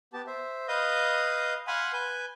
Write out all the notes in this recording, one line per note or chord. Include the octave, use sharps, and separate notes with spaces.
B3 G4 A5
C5 E5
B4 D#5 F5 D#6 G6
F5 F#5 G#5 B5 C6
B4 G#5 G6